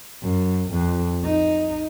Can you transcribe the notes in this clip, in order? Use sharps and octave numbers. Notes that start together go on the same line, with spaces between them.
F#2
F2
D#4